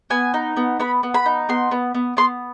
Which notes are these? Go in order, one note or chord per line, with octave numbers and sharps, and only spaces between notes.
B3 G#5
D#4
B3
B3 B5
B3
B5
D#4
B3 C6
B3
B3
B3 C6